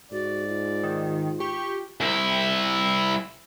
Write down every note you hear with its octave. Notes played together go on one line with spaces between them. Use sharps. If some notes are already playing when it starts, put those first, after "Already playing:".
G#2 F#4 D5
F4
D#3
G4 C#6
C2 E4